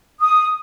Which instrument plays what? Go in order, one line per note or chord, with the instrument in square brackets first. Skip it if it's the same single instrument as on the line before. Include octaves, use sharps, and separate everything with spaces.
[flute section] D#6